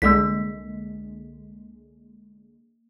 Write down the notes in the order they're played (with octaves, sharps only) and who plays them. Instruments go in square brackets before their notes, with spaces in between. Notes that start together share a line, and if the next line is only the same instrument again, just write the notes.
[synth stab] C2 D3 G#3 [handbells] A#3 B6